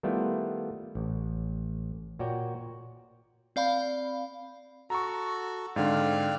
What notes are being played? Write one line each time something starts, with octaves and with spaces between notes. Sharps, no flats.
D#3 G3 A3 B3 E4 F4
A1
A#2 F#4 C#5 D5 G5
C4 D5 F5 B5
F#4 A4 A#5 C#6
G#2 D3 C4 D5 F5